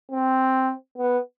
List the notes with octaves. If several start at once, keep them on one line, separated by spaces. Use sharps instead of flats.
C4
B3